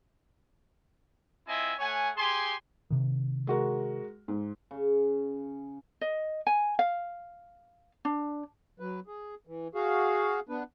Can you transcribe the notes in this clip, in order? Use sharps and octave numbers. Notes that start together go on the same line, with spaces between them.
C4 E4 F4 D#5 E5 G#5
A3 C#5 F#5 G#5
G4 G#4 G#5 C6
C3 D#3
G#3 F#4 A#4
G#2
C#3
D#5
G#5
F5
D4
F#3 B4
G#4
E3
F#4 G#4 F5
B3 D4 B4